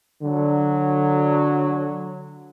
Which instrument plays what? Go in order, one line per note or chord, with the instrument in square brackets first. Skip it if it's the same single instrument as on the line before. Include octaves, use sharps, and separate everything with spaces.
[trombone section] D3 F#3